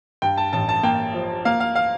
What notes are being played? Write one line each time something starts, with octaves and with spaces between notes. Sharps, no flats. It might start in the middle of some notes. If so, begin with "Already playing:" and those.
G2 G5
A5
A1 A5
A5
A#3 G5
F3
A#3 F5
F5
F5